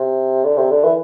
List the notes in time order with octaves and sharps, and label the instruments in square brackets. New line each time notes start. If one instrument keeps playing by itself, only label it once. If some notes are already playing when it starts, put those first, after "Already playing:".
Already playing: [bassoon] C3
D3
C3
D3
E3